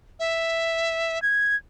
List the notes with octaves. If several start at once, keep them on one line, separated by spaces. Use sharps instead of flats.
E5
G#6